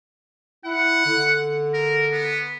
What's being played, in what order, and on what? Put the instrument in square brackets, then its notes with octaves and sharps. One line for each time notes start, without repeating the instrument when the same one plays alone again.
[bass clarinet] E4 [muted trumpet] F#5
[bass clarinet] D3
[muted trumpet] A#4
B3